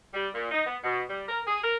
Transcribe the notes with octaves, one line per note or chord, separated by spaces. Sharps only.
G3
A#2
D#4
B3
B2
G3
A#4
G#4
A#4